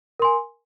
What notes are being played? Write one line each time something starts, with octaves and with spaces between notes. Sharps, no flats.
A#4 G#5 C6